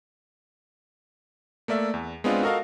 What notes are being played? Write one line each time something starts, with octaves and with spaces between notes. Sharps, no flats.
A3 A#3 D5 E5
E2
G#3 B3 C4 D4 F4 D#5
F#4 A4 A#4 D#5 F5